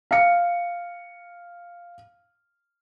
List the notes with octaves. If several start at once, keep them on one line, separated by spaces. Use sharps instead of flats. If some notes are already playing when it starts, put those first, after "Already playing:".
F5 C#7